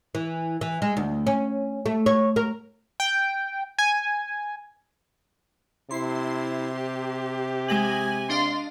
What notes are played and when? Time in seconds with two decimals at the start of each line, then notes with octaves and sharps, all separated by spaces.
0.15 E3
0.61 E3
0.82 G#3
0.97 D2
1.27 C#4
1.86 A3
2.06 C#5
2.36 A#4
3.00 G5
3.78 G#5
5.91 C3 E4 C6 C7
6.75 G4
7.68 G#3 G#5 A#6 F#7
8.30 D4 D#5 F5 C6